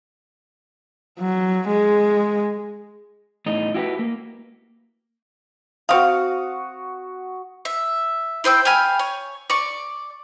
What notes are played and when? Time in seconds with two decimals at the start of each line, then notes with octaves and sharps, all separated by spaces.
1.20 F#3
1.68 G#3
3.46 E2 A2 D#4
3.74 E4 F#4 G4 A4 B4
3.99 A#3
5.89 C4 F#4 F5 C#6 D#6
7.65 E5
8.44 E4 C5 G5 E6
8.65 G4 F5 G#5 B5
8.99 C#5
9.50 D5 C#6